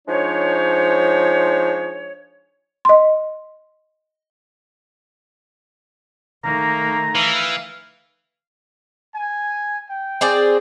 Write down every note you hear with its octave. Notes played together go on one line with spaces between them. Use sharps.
F3 G#3 D4 D#4 C5 C#5
D#5 C6
D#3 A3 A#3 A#5
E3 F5
G#5
G5
C4 G#4 D5